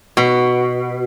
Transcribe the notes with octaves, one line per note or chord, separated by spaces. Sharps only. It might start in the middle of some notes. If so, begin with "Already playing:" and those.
B2